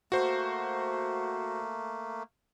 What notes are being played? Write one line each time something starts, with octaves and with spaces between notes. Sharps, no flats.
A3 A#3 F#4 C5